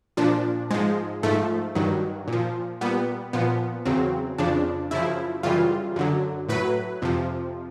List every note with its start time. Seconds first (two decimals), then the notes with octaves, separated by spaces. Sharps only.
0.17 A#2 F3 D4
0.70 G#2 F3 G#3
1.23 G#2 F3 A3
1.75 G2 D#3 F#3
2.28 A#2 F3
2.81 A#2 G3 B3
3.33 A#2 F3 B3
3.85 E2 C#3 F#3 C4
4.38 F2 C#3 F3 D4
4.91 F#2 C#3 F3 E4
5.43 F#2 C#3 E3 G3 F4
5.96 F#2 D3 F#3
6.49 A2 F#3 B4
7.02 F2 C3 F3